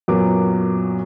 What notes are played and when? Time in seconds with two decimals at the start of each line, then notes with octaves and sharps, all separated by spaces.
0.08 F#2 A#2 F#3 B3 D6